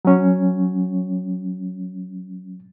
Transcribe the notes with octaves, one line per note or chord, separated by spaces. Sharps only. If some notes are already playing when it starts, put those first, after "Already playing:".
F#3 C#4